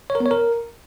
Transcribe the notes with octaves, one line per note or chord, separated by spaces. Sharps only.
C#5
A#4
B3
C#5
A#4